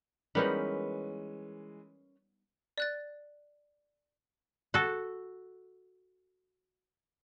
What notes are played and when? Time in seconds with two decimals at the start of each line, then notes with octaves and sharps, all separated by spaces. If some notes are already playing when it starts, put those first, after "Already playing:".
0.35 E3 G3 G#3 B3 C#4 D#4 A#4 B4
2.78 D5 F#6 A6
4.74 F#4 A4